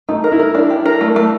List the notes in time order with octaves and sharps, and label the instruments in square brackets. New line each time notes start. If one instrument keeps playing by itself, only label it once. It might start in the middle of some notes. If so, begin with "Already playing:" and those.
[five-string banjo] A3 [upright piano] D#4
[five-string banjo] A#4
[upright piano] E4
[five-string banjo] A#4
D4
G4
A#4
A3
A3